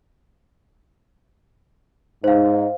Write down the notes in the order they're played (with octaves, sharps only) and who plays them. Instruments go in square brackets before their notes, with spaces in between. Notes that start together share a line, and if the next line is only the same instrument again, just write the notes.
[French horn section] G#2 D#4 [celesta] C5 F5